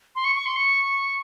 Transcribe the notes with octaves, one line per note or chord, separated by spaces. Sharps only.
C6
C#6
C#6
C6
C#6